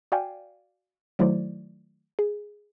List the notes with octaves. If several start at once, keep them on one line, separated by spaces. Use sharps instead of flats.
F#4 D5 F5 G5 G#5
D#3 F#3 A3 E4 C5 D5
G#4